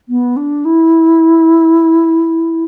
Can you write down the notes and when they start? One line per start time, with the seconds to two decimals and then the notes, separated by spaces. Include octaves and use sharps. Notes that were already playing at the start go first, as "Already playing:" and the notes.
0.09 B3
0.37 D4
0.65 E4